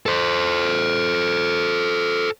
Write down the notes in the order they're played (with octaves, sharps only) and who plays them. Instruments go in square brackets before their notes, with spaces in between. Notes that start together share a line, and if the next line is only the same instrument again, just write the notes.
[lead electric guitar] A4 C5